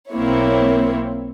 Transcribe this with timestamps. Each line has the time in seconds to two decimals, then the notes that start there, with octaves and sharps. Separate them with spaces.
0.11 B1 A#3 C4 E4 C#5